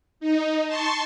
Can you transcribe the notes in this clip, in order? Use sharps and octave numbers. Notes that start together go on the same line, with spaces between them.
D#4
A5 C6 C#6